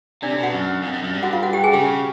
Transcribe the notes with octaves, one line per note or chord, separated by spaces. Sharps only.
C3 D4 D5
B2 D4 D5
F#4 F#5
F#2
F2
F2
F#2
G2
F#4 F#5
F4 F5
F#4 F#5
G4 G5
G#4 G#5
C#3 G4 G5